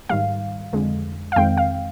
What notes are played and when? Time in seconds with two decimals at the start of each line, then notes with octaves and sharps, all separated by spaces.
0.09 G#2 D#3 G3 F5
0.73 F2 D3 G#3
1.32 F5
1.36 F2 D#3 G#3 C4 G5
1.57 F5